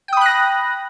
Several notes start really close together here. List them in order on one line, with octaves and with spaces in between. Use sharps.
G5 D#6 B5 F#6 A#6